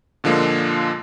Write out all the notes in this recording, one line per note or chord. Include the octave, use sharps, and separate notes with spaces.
A#2 D3 F3 G#3 A#3